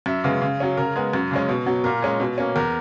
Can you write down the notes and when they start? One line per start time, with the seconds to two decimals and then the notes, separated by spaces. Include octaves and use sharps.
0.06 F#2 E5
0.24 C#3 G#3 B3
0.42 C#3
0.60 F#3 C#4
0.77 C#3 A#4
0.96 G#3 B3
1.13 F#2
1.31 C#3 G#3 C#4
1.49 B2
1.66 F#3 B3
1.84 A#2 A#4
2.02 G#3 C#4
2.20 B2
2.38 A#3 C#4
2.56 E2 A#4